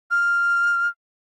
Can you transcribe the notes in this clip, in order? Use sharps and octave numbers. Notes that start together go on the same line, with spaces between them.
F6